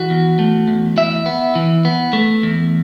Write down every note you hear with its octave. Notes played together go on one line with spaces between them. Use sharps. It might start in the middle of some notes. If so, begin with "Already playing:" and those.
Already playing: E3 F#4
E2
A3
E2
E3 E5
B3
E3
B3
A3
E2